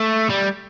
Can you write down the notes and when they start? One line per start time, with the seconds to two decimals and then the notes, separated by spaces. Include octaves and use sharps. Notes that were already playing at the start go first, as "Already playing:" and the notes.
Already playing: A3
0.30 G3